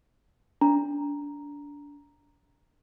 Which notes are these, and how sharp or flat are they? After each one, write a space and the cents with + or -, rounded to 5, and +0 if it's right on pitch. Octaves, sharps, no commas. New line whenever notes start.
D4 -25 A#5 +0